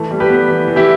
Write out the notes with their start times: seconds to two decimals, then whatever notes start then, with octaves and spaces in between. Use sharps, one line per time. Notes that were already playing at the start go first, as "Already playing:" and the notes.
Already playing: E3 A3
0.11 G3
0.20 G4 B4
0.29 B3
0.48 E3
0.67 E3
0.76 E4 G4